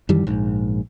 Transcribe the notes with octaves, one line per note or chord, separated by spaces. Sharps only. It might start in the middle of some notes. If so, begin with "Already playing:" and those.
F#2 D#3 E3 G3
A#1 G#2